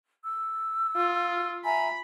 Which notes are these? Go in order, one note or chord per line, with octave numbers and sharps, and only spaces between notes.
E6
F4
E5 G#5 A#5 B5